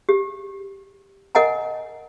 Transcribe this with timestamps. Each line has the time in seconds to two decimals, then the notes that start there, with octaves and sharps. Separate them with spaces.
0.09 G4
1.35 A#4 D#5 F#5 G#5 A#5